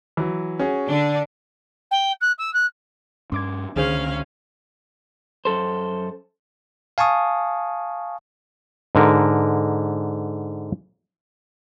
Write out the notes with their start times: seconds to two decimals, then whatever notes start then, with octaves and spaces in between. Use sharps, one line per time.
0.17 E3 F#3
0.59 C#4 F#4 G#4
0.89 D3 D4 D7 G7
1.91 G5
2.21 F#6
2.38 E6
2.53 F#6
3.32 G2 C#4 C6 D6 G#6
3.76 C#2 D3 D#3 C#4 G#4 C5 F5
5.45 F#2 A4 C5
6.98 F5 G#5 A5 C#6 D#6
8.95 G#2 D3 A#4